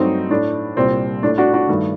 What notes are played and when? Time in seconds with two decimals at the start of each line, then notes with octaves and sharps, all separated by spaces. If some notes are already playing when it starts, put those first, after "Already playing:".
Already playing: G2 F#3 A3 C4 D#4
0.30 A2 A3 D4
0.77 C2 A#2 G3 C4
1.22 A2 D4
1.26 A3
1.38 D4 F#4
1.53 D4 F#4
1.69 G2 D#3 A3